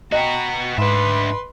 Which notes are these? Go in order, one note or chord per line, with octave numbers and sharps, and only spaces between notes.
B3 F#4 D#5 G5 A#5
G#2 D4 B4 E5 C6